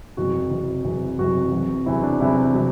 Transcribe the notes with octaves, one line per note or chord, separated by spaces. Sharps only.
F#1 E2 C3 F#3 F#4
F#1 E2 C3 F#3
F#1 E2 C3 F#3
F#1 E2 C3 F#3 F#4
E2 C3 F#3
E2 C3 F#3 E4
D4
E2 C3 F#3 E4
C3 F#3